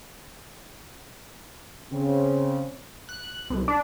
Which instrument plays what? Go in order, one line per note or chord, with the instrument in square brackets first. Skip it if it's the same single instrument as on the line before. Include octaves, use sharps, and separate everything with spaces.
[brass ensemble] C#3 C4
[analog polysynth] F#6
C2
D4